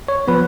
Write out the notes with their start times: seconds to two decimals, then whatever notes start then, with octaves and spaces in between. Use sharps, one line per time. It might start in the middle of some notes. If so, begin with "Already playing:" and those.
0.08 C#5
0.28 F3 B3 B4